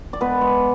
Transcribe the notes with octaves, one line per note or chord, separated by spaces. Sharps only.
D5
G#3 B3 B4
G#3